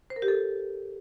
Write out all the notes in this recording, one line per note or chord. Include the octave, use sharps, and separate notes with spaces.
C5
A#4
G4
A4